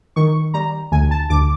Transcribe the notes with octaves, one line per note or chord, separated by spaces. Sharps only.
D#3 C#6
G3 A#5
D2 G#5
A5
D2 D6